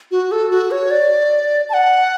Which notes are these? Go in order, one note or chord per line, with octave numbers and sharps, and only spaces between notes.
F#4
A4
F#4
C#5
D5
A5
F#5